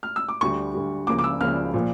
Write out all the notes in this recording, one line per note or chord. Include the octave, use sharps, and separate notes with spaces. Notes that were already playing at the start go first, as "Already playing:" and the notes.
F6
E6
D6
D2 D3 G3 C#6
D2 D3 G3
C#2 C#3 F3 A#3 D6
D6
E6
C#2 C#3 F3 A#3 F6
A#2 F3 A#3